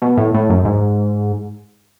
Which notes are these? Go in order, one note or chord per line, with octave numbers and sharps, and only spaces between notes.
B2
A2
A2
F#2
G#2